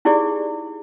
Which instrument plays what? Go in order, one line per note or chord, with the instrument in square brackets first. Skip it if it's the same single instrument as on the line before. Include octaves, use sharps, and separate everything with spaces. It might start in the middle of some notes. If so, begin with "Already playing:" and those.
[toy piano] D#4 E4 G4 G#4 D5